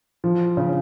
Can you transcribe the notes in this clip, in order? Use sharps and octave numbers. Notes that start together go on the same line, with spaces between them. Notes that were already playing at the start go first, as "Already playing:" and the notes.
F3
C#3